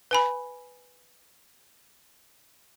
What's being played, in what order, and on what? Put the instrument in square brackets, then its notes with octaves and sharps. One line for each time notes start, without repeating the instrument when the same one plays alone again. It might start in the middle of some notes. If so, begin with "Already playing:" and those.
[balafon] B4 G#5 B5